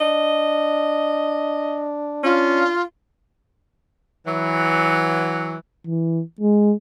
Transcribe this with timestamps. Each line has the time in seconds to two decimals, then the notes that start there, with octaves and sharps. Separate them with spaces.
0.01 D4 D#5
2.23 C#4 F4
4.26 E3 F#3
5.87 E3
6.41 G#3